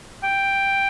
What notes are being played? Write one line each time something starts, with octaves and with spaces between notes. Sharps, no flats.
G5